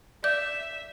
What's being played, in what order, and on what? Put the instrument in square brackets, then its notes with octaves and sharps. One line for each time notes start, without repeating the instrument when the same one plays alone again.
[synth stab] D5 [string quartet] E5 [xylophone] G6